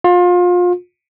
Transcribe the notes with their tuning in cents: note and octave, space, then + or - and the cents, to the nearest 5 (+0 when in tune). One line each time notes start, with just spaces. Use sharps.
F4 +30